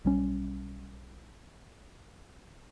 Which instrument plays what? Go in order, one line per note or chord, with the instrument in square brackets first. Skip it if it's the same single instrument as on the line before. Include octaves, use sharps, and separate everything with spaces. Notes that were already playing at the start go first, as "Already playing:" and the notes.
[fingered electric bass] B1 G3 C#4